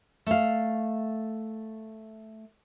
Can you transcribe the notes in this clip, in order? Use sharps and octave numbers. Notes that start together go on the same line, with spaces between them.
A3 F5